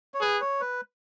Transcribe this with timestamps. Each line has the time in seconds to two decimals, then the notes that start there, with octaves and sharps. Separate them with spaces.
0.14 C#5
0.21 G#4 B4
0.41 C#5
0.61 B4